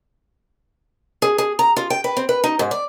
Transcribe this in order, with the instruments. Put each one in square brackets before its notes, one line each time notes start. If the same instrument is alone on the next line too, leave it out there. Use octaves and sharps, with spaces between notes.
[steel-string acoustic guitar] G#4
G#4
A#5
F4
G5
B4
C4
B4
D#4
G#2
D5